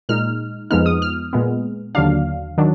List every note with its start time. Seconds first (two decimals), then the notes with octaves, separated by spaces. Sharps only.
0.09 A#2 G#3 D#4 F6
0.71 F2 F3 G#3 B3 D#4 F6
0.86 D#6
1.02 F6
1.33 A#2 G#3 B3
1.95 D#2 D3 F#3 D4 F5
2.58 D#3 F#3 D4